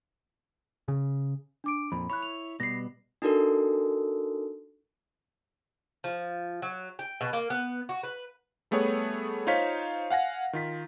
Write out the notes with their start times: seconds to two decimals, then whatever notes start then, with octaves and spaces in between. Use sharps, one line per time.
0.88 C#3
1.64 D4 D6 D7
1.92 F2 A#2 B5
2.10 E4 C#5 B5 F#6
2.22 F7
2.60 B2 G3 B3 A#6 C7
3.22 D4 D#4 F#4 A4 A#4
6.04 F3
6.62 F#3
6.99 G5
7.21 B2
7.33 A#3
7.50 B3
7.89 F#4
8.03 B4
8.71 G3 A3 B3 G#4 C#5
9.47 D#4 F4 C5 C#5 F5 B6
10.11 F5 F#5 G#5 A#6
10.53 D#3 F4 B6